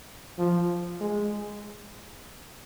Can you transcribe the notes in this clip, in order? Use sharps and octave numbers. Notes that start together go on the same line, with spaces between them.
F3
G#3